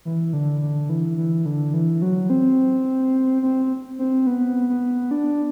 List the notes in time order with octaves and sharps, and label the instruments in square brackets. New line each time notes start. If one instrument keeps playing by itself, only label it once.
[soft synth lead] E3
D3
D3
E3
E3
D3
E3
F#3
C4
C4
C4
B3
B3
D4